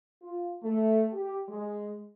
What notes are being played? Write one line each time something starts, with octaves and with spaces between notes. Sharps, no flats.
F4
A3
G4
G#3